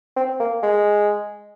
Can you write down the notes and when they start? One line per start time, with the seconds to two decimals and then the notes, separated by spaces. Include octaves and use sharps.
0.16 C4
0.40 A#3
0.63 G#3